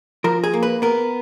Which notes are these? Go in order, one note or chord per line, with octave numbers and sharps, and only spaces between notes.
F3 A#4
G#4
A#3
B4
B3 A#4